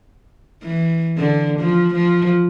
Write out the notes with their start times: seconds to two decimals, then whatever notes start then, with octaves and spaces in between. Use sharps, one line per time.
0.64 E3
1.18 D3
1.59 F3
1.94 F3